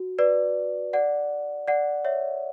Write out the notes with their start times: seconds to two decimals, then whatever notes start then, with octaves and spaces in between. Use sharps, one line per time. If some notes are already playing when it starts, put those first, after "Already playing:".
Already playing: F#4
0.19 B4 D5
0.93 D5 F#5
1.67 D5 F#5
2.05 C#5 E5